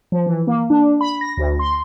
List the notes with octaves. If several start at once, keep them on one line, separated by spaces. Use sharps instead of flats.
F3
E3
A#3
D4
B5
A#6
D2
C6